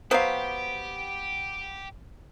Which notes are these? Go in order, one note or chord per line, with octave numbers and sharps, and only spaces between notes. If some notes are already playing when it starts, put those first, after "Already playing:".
F#3 B3 G4 C5 F5